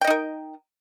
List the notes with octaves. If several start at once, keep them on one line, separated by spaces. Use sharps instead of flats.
D#4 A#4 D#5 G5